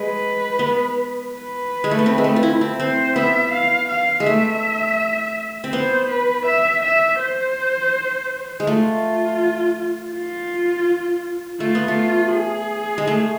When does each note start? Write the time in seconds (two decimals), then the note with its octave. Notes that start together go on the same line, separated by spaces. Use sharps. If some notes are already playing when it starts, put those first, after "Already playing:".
Already playing: G#3 B4
0.59 B3
1.32 B4
1.84 G#3
1.91 A3
1.99 B3
2.06 C4
2.18 G#3
2.24 A3
2.36 F4
2.43 E4
2.61 C4
2.80 C4 C5
3.16 B3 E5
3.52 F5
3.89 F5
4.20 G#3
4.26 A3 E5
5.64 C4
5.73 B3 C5
6.09 B4
6.46 E5
6.83 E5
7.20 C5
8.60 G#3
8.67 A3 F4
10.14 F4
11.60 A3 F4
11.75 B3
11.88 A3
12.34 G#4
12.98 G#3
13.07 A3